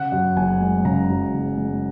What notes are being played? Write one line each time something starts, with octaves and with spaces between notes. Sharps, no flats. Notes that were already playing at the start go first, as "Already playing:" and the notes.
Already playing: C#3 F#5
F#2
F#1 G#5
G#3
C#3 A#5
F#2
F#1
G#3